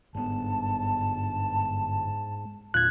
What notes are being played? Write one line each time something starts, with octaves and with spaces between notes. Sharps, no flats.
G1 G#2 B3 A5
E2 A#2 F4 F#6 G#6